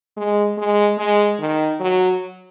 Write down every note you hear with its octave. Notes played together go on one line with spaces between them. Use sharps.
G#3
G#3
G#3
D#3
F#3